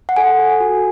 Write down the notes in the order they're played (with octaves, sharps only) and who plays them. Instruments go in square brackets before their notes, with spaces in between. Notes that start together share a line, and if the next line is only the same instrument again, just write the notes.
[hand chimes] F#5
A4 G#5
A4
F#4